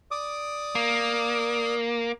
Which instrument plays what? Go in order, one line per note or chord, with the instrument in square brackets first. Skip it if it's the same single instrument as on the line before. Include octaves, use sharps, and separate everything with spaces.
[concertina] D5 D6 D#6
[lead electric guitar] A#3